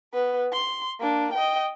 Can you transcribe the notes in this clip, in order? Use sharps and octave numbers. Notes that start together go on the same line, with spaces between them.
B3 B4
C6
A#3 D4
D#5 G5